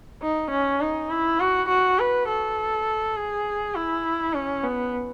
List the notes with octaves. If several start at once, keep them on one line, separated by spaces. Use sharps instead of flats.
D#4
C#4
D#4
E4
F#4
F#4
B4
A4
G#4
E4
C#4
B3